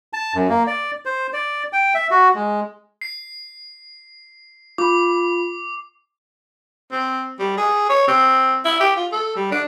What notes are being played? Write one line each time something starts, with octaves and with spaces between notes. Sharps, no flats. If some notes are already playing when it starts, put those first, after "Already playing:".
A5
F#2
A#3
D5
C5
D5
G5
E5
F#4
G#3
C7
F4 B5 D6
C4
G3
G#4
C#5
C4
E4
G4
F4
A4
G3
D4